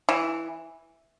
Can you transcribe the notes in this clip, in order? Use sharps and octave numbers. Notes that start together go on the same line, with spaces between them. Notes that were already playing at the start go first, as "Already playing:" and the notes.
E3